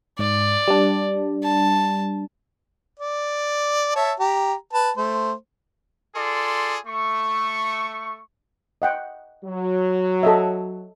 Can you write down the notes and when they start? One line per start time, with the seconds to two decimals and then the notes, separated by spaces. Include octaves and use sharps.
0.19 G#2 D5
0.68 G3 D4
1.44 A5
2.99 D5
3.95 C#5 E5 A5
4.19 G4 A#5
4.73 B4 A5
4.97 A3 C5
6.15 F4 G#4 A4 D5 C6
6.86 A3 C#6
8.82 D#5 F#5 G5
9.45 F#3
10.23 A4 D#5 E5